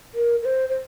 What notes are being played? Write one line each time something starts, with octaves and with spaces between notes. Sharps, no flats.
A#4
A#4
C5
C5